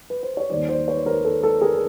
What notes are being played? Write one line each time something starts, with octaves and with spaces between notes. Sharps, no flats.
B4
C5
C#5
D#2 D#3 G3 C5 D5
C5 D5
B4 C#5
A#4 C5
A4 B4
A4
G#4 A#4